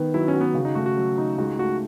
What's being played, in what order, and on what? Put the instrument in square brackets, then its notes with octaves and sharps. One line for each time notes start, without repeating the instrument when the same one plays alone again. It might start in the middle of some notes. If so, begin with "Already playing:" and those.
Already playing: [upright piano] D#3 B3
[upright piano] F#3 [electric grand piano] E4
[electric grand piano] C#4
[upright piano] F#4
[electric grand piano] B3
[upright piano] C#3
[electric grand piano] D#4
[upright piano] A3 [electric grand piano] F#4
[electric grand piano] F#4
[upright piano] F#3
D#4
[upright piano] C#2 [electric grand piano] F#4
[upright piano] A3 [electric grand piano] F#4